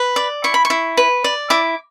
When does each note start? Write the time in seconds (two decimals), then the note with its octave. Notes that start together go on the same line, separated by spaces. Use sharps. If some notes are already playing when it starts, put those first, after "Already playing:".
Already playing: B4
0.16 D5
0.44 E4 C#6
0.54 B5
0.65 C#6
0.70 E4
0.97 B4
1.24 D5
1.50 E4 D6